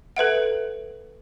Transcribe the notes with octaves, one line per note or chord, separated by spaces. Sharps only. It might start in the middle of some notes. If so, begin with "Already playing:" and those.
A4 B4 E5 F#5